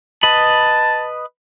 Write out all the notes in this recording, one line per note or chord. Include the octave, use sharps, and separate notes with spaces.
B4 D#5 A5 B5